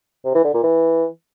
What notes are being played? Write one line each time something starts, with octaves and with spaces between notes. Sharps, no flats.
C3
E3
D3
A#2
E3